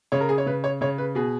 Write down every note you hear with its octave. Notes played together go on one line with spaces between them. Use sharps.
C#3 C#5
A#4
G#4
C#5
C#3 B4
C#5
C#3 C#5
B4
B2 G#4